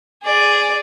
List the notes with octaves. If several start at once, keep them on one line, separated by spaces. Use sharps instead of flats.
G#4 D5